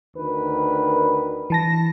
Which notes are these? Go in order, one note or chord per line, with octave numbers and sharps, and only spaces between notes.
D2 D#3 B4
E3 A5 A#6